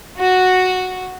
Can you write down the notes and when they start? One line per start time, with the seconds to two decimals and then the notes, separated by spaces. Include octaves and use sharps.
0.18 F#4